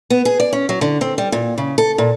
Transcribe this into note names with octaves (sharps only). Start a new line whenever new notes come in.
B3
G#4
D5
C#4
F#3
D3
C4
G3
A#2
C#3
A4
A#2